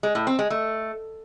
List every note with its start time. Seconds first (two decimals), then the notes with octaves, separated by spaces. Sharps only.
0.03 G#3
0.15 A2
0.27 C4
0.39 G#3
0.50 A3